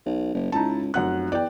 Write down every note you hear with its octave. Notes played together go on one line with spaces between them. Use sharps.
B1
F#1
C#2 D#4 E4 A5
F1 F#2 F#5 F#6
E2 D5 G5